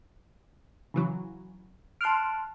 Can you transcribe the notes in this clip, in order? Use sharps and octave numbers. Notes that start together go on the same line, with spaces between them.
C#3 E3 F#3
A5 C6 F6 F#6 D7